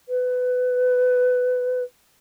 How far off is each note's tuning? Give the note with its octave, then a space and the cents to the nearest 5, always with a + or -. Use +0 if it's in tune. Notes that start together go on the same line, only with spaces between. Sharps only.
B4 +20